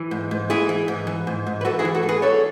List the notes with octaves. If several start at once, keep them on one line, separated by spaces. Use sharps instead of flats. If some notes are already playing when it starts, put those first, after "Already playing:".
Already playing: E3
G#2
G#2
E3 E4 G#4
E3
G#2
E3
G#2
G#2
B4
E3 F#4 A4
E4 G#4
E3
F#4 A4
G#2
G#4 B4
E3 A4 C#5